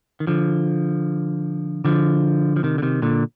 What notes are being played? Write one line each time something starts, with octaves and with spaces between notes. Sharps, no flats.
D#3
D3 F3
D3 F3
F3
C3 D#3
D3
C3 D#3
A#2 D3